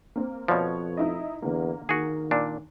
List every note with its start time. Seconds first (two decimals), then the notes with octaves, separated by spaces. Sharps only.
0.16 A#3 C4
0.48 F2 B2 F3 B4 C#5
0.97 D#4 E4 D#5
1.42 E2 D3 A#3
1.89 D#3 F#4 G#4
2.31 A#2 D4